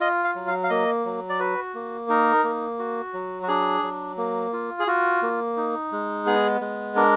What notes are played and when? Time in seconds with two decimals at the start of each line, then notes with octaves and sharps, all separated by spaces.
0.01 F4 D#5
0.24 F5
0.35 F#3
0.47 F5
0.63 F5
0.70 A#3 D#5
1.05 F#3
1.29 D5
1.39 F#4 B4
1.75 A#3
2.09 D#4 A#4
2.44 A#3
2.79 F#4
3.13 F#3
3.43 F#4
3.48 D4 G#4
3.83 F#3
4.17 A#3
4.53 F4
4.80 G#4
4.87 F4 F#4
5.22 A#3
5.57 D#4
5.92 G#3
6.26 B3 G#4
6.61 G#3
6.96 D4 A#4